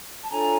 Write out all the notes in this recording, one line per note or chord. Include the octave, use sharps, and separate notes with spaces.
A5
D4 F4 A4 C#5 G#5 A#5